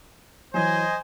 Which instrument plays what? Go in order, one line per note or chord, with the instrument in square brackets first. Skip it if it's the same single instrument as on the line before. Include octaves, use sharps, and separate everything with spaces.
[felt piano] E3 F#3 [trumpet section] C5 D#5 [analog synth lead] G#5